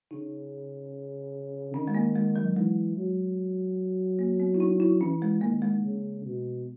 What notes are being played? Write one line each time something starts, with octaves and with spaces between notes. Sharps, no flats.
C#3 D#4
D#3 C#4
G#3
A#3
G#3
F#3
E3 G#3
F#3
A#3
B3
E4
D#4
E4
E3 C#4
G#3
D#3 A#3
G#3
C#3
B2